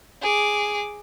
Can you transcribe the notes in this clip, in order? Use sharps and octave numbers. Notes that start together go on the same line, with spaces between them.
G#4 D6